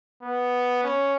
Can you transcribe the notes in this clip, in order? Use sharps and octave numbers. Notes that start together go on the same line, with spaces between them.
B3
C#4